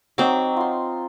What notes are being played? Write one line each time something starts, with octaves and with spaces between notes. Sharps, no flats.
F#3 C4 D#4 D6
F4 C6